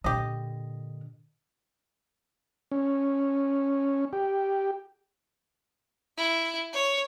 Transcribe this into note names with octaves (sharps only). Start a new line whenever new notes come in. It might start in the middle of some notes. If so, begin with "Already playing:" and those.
A#2 D3 G4 D#5
C#4
G4
E4
C#5